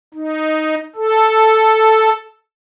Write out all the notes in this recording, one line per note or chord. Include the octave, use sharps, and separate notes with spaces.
D#4
A4